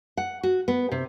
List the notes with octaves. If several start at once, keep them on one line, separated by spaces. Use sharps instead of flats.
F#5
F#4
B3
C3